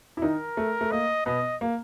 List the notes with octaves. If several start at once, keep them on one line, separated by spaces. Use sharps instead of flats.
E4
D#3 D#4 A#4
A3
A3
A#3 D#5
B2 B3 D#5
A#3